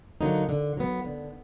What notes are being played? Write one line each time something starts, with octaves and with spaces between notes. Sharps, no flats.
D3 F#3 A#3 D#4
D3
F#3 B3
D3